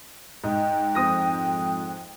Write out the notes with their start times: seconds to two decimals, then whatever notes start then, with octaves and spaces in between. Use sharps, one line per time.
0.44 G#2 D#5 G5
0.95 F2 C5 D#6 A#6